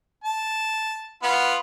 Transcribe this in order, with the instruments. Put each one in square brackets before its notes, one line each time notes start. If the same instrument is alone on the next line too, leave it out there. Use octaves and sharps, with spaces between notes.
[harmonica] A5
B3 F4 B4